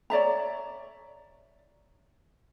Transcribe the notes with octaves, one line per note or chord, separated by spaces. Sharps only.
C#5 D5 E5 A#5